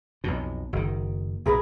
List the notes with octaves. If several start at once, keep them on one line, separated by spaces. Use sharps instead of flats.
B1 F2 B2
F#1 D#3
B1 A2 G#4 A#4 B4